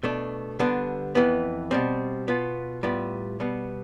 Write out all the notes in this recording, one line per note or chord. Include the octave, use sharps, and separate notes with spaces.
B2 A3 D4
D3 G3 B3 D4
F2 E3 B3
B2 G3 C4
B2 B3 F4
A2 G3 B3 F4
B2 G3 B3